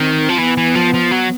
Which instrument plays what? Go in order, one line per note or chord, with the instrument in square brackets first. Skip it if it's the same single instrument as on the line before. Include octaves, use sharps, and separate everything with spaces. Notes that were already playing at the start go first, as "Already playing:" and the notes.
Already playing: [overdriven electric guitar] D#3 [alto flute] C4
[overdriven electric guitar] F3
[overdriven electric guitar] E3 [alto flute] B3
[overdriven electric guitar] E3
F3
F3
F#3